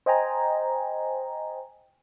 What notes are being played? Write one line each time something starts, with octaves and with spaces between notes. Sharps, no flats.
C5 D#5 G5 G#5 A#5